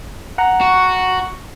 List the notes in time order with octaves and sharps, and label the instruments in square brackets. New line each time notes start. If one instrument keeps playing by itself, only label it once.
[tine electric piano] F#5 A#5
[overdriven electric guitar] F#4